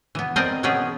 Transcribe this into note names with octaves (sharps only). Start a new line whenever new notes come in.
E3 B3
C4 A#4 C5 D5 D#5
B2 E3 B3 C#4 G#4 G5